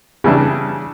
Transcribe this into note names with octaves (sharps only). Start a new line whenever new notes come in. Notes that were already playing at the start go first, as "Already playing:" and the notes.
C#3 E3 G3 D4